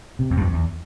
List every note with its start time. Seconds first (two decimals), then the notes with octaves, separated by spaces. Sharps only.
0.19 C3
0.30 F2
0.37 G2
0.41 F2
0.53 E2